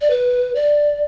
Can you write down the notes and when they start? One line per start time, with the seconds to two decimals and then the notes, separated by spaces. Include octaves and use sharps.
0.01 D5
0.10 B4
0.55 D5